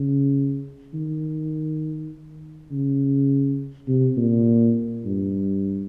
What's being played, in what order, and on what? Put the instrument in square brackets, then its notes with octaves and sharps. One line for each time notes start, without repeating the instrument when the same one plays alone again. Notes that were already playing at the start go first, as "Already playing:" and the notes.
Already playing: [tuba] C#3
D#3
C#3
C3
A#2
G2